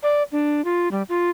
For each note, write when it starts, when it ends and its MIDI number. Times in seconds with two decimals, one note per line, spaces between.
0.03 0.23 74
0.32 0.64 62
0.65 0.88 65
0.92 1.03 55
1.09 1.30 65